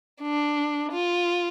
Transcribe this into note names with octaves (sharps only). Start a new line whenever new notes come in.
D4
F4